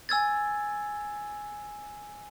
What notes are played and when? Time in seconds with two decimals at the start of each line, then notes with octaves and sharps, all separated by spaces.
0.09 G#5 E6 G#6 A6